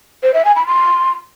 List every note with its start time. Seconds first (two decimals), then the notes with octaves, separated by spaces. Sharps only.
0.23 C5
0.34 E5
0.45 G#5
0.56 B5
0.67 C6